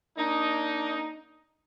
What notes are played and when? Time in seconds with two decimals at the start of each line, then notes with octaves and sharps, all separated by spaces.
0.18 A#3 D4 D#4